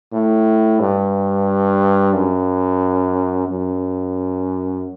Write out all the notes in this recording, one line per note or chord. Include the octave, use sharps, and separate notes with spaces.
A2
G2
F#2
F#2